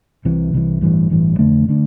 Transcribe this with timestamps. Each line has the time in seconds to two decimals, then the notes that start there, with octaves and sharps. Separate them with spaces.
0.25 C2 C3 E3
0.53 C2 C3 E3
0.81 A1 G2 E3
1.10 A1 G2 E3
1.39 F2 D3 A3 D4
1.68 D3 A3 D4